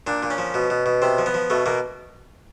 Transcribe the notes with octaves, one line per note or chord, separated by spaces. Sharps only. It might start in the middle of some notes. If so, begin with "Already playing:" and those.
A#2 D4
A#2
C#4
F3
B2
B2
B2
C3 C4
F3
B3
F3
B2 A3
B2 A#3